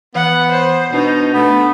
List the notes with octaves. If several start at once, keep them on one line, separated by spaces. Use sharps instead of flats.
E3 B3 F#5
C5
B2 D4 D#4
A3 B3